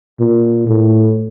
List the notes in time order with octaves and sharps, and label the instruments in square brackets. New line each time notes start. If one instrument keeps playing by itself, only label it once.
[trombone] A#2
A2